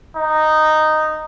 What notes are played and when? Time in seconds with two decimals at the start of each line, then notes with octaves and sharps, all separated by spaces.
0.16 D#4